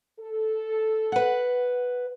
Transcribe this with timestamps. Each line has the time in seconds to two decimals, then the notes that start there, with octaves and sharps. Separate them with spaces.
0.19 A4
1.12 B4 F#5